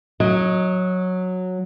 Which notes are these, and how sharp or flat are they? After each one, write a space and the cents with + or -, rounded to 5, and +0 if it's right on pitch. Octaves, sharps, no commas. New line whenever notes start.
F#3 -10 D#5 +10